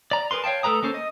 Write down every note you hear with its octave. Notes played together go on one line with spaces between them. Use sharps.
D5 A#5
G#4 A#4 B4 C6
C#5 F5 G5 A5
A3 A4 B4 A#5 D#6
A#3 C#4 A4 C5
D#5